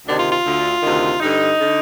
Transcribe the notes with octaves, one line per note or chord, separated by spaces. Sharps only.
D2 C3 D#3 D4
F4
F4
D2 D3
D2 C3 D#3
G2 D3 D#4
D3